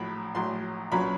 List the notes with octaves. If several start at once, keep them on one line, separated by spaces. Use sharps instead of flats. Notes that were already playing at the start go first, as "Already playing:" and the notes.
Already playing: A#1 A2 F#3 B5
A#1 A2 F#3 C6
B1 A#2 F#3 A#3 C#4 B5